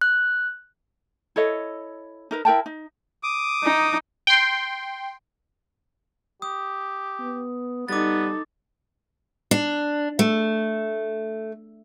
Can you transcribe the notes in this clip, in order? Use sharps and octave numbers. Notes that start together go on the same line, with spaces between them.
F#6
E4 A4 C#5 D#5
D#4 A#4 B4
E4 A#4 G5 A5
D#4
D6 D#6
D#4
G5 C6
G4 D#6
B3
G3 B3 D#4 A4 D6 A6
D4
A3